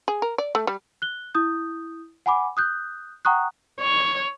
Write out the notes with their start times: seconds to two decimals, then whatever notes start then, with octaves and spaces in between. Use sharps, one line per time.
0.08 G#4
0.22 A#4
0.38 D5
0.55 A3
0.67 G3
1.02 F#6 G7
1.34 E4 D#6 G6
2.26 F#5 G#5 B5 D6
2.57 D#6 F#6 G6
3.25 F#5 G5 A#5 C#6 D#6 F#6
3.80 C#5